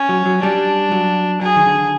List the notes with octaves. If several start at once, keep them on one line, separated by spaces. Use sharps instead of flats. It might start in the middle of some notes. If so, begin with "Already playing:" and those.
Already playing: C#4
F#3
F#3
G3 D4
F#3
F#3 G#4
D#3
D3